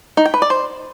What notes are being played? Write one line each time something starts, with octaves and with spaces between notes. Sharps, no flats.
D#4
G5
B4
D5
C5